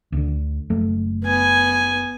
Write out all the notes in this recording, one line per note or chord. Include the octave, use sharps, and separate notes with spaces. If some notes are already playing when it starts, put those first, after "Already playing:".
D2 D3
F#1 A3
B3 G#5